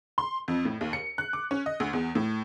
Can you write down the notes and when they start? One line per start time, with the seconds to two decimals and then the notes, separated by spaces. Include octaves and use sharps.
0.18 C6
0.48 F2
0.65 A2
0.81 D#2
0.93 C#7
1.18 F#6
1.33 D6
1.51 C#4
1.66 D#5
1.80 D2
1.93 E2
2.15 A2